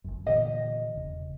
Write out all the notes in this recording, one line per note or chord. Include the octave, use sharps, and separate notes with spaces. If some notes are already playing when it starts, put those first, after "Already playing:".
G#1 C#2 F#2
A#2 D3 E3 G4 D#5
E1 C#3